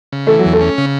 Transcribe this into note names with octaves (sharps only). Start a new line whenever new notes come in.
C#3
E3 A3
F#3
E2
A3
C#4
C#3